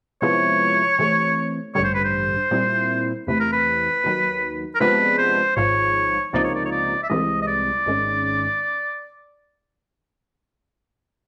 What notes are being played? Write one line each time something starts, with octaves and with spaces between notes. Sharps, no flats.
C3 F3 G#3 B3 E4 C#5
C3 E3 A3
A1 G2 D3 G3 C#5
C5
B4
C5
A#2 G3 C4 E4
E2 C3 E3 A3 B4
A#4
B4
D#2 D#3 F#3
A#4
C3 F3 G#3 B3 D4 B4
C5
G#1 G#2 F3 C#5
C#2 C3 F3 A#3 D#4 D5
C#5
D5
C#5
D5
E5
C2 C3 E3 G#3 D#5
D#5
D5
G#1 G#2 D#3 G#3 C#4